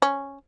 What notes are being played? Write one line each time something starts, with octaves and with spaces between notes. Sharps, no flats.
C#4